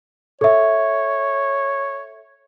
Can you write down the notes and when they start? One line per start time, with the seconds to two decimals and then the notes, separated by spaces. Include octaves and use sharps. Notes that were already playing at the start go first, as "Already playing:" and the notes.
0.41 A4 C#5 E5